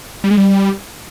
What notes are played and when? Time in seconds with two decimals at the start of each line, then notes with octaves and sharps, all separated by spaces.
0.24 G3
0.31 G#3
0.37 G3